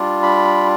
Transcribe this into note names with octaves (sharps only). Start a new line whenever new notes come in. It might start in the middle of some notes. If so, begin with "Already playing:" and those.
Already playing: G3 D4 F4
B5